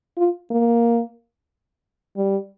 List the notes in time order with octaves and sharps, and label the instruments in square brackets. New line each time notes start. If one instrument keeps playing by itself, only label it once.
[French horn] F4
A#3
G3